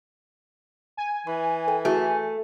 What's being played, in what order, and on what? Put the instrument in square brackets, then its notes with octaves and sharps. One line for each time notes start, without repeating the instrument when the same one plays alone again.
[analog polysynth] G#5
[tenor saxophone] E3 [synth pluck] B5
[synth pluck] A4 G5
[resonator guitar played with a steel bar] A3 [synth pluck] E4 F#4 G#4